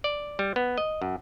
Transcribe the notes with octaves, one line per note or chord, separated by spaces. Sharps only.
D5
G3
B3
D#5
F#2